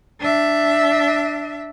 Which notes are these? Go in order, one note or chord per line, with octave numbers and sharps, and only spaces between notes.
D4 E5